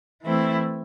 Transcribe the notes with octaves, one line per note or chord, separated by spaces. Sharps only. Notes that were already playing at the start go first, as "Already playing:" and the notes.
E3 A3 C4 E4